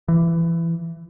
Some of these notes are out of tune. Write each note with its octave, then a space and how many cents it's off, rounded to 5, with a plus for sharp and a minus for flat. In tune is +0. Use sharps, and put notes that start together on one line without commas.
E3 +20